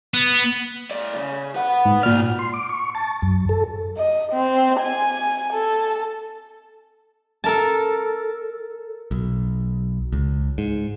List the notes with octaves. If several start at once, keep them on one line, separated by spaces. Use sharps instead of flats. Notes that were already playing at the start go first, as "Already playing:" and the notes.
B3
A2 D5
C#3
B4 F#5
G#2
A#2 F#4 D5 F6
C6
D6
C#6
A5
F#2
A4
D#5
C4
G#5
A4
A4 A#4 A5
B1
C#2
G#2